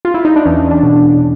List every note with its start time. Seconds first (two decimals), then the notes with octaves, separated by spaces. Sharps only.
0.05 F4
0.14 E4
0.25 D#4
0.36 D4
0.45 E2 C#4
0.71 D4
0.83 B2
0.96 D4